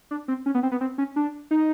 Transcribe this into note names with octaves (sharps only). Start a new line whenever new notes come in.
D4
C4
C#4
B3
C4
B3
C4
C#4
D4
D#4